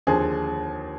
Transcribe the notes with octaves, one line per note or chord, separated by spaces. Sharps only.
D#2 D3 F3 G#4 C5